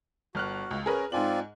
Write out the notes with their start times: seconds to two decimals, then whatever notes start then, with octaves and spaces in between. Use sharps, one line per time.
0.35 G1 F#4 F6 F#6
0.71 C#2
0.86 C#4 G#4 A#4 B4
1.12 G#2 C4 F4 D5 G#5 F#7